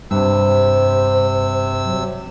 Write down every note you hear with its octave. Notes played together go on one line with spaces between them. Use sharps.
G2 C3 C5 E6
F#3